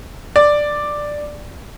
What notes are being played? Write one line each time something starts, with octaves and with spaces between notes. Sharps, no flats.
D5